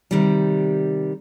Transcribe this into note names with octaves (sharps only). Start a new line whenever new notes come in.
C3 D#3 G3